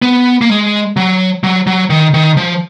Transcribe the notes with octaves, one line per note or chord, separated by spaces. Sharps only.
B3
A#3
G#3
F#3
F#3
F#3
D#3
D#3
F3